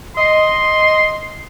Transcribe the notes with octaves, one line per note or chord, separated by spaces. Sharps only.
D#5 C6